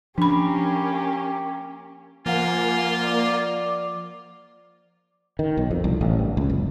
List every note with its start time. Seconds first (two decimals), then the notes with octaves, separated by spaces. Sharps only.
0.18 F3 A#3 C#4 D4 G4 B5
2.26 F3 A#3 F4 F#5 G#5
3.04 D5
5.39 D#3
5.57 B1
5.71 F2
5.84 C2
6.01 A1
6.19 G2
6.37 C#2
6.50 F#1